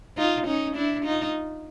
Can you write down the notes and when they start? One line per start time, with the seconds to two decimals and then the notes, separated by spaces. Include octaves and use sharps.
0.17 D#4 F4
0.47 C#4 D#4
0.76 D4 E4
1.05 D#4 F4